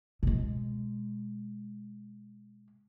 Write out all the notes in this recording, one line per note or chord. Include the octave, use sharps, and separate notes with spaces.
B2 G#3